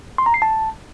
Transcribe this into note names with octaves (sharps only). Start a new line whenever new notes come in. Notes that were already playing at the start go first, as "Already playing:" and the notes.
C6
A#5
C7
A5